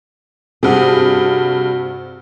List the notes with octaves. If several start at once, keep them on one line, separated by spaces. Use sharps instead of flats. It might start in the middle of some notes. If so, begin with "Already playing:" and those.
G2 C3 F#4 G#4